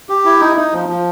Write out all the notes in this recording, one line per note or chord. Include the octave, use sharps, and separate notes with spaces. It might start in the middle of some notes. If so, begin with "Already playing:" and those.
G4
E4
D#4
D#4
F3
F3